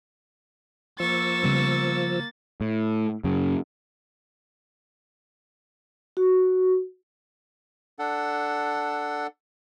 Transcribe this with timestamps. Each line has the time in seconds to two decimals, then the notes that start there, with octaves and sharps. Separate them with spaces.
1.00 F3 A#3 C#6 E6 A6
1.43 C#3 G3 B3
2.61 A2
3.24 F#2 C#3
6.17 F#4
7.99 D4 A4 F#5